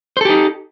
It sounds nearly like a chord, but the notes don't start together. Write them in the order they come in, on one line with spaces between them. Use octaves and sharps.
C5 A4 G4 D#4